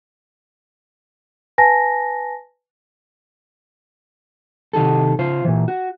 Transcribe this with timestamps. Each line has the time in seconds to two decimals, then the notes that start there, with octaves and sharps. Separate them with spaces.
1.58 B4 G#5 A5 A#6
4.73 C3 D#3 D#4 G4 A4
5.19 C#3 F4 C5
5.45 A#2 E3
5.68 F#4